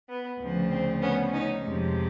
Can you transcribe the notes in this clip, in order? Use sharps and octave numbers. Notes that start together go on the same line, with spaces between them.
B3
D2 C#3 F3
C4
B3 C#4
C#4 D#4
F2 C3 F3 G#3